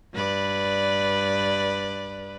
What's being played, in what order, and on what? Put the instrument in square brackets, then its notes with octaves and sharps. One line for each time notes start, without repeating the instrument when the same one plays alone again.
[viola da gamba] G2 B4 D5